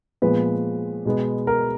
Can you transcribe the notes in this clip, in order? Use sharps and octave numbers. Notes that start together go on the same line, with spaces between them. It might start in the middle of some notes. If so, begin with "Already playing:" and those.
A#2 F3 G#3 B3 B4
B2 G#3 B3
A#4